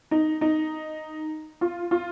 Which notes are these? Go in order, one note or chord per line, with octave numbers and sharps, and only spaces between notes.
D#4
D#4
F4
F4